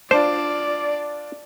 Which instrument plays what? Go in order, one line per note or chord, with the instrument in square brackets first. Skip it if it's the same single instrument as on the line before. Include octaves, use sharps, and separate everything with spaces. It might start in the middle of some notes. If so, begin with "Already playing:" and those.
[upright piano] D4 F4 [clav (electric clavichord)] C5 [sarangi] D5